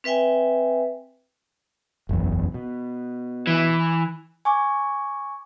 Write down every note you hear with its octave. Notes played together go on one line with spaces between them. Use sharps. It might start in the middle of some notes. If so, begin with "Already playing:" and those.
C4 B4 E5 G5 G#5
F#1 B1 E2
B2
E3
G#5 C#6 D6